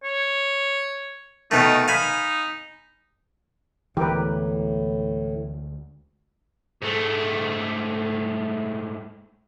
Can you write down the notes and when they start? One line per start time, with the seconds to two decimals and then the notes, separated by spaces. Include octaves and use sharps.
0.04 C#5
1.51 B2 D#3 A3 D#4
1.88 D#4 F5 G#5 B5
3.97 D2 A2 E3 G#3 B3 G4 A#4 B4
6.82 G#2 A3